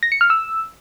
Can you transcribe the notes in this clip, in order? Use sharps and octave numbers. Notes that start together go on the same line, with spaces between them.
A#6
C#7
F6
E6